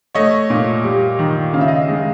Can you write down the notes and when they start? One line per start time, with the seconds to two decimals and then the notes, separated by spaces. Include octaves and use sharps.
0.15 A3 C#5 D#5
0.50 A#2
0.84 G3
1.19 D#3
1.53 C#3 F5
1.61 E5
1.68 D#5 F5
1.88 G#3